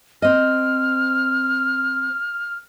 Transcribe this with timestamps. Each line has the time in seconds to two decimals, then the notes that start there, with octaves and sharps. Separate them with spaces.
0.22 C4 D#5 F6